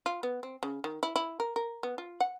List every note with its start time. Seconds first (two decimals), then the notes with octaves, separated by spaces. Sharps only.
0.06 F4
0.23 B3
0.43 C4
0.63 C#3
0.84 D#3
1.03 E4
1.16 E4
1.40 A#4
1.56 A#4
1.83 B3
1.98 F4
2.20 F#5